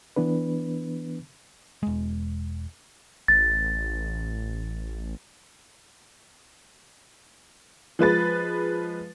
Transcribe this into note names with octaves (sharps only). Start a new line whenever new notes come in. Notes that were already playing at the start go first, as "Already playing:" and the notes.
E3 B3 D4 B4
E1 G#3
A1 A6
F3 G#3 B4 A6